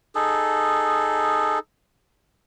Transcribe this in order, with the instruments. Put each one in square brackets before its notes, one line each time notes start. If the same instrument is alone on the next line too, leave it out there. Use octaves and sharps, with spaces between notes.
[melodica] D#4 G#4 A4